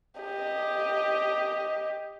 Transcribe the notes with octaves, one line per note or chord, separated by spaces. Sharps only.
G4 D#5